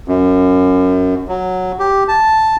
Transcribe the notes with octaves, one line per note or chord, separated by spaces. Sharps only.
F#2
F#3
G4
A5